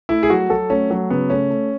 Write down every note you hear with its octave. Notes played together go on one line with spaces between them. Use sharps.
A3 E4
G#4
F#3 F#4
F#3 A4
A3 C#4
F#3
C#3 B3
A3 C#4
A3